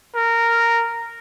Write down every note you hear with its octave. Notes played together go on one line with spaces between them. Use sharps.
A#4